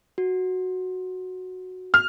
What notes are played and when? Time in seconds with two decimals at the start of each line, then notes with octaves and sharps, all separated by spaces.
0.18 F#4
1.94 F6